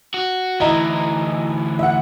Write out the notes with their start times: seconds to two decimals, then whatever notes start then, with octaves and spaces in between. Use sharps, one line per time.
0.14 F#4
0.60 D2 E3 E4 D#5 A#5
1.79 E5 F#5